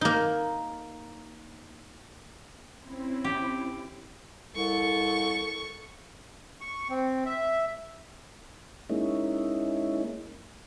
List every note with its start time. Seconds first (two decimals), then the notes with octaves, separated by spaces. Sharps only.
0.01 A#3 D#4
2.83 C4 C#4 E4
3.24 G4
4.55 C2 A4 C#6
6.61 C#6
6.90 C4
7.26 E5
8.90 G#3 A#3 C#4 D#4 E4